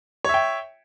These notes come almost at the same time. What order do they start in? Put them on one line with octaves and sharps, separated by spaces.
C#5 E5 G5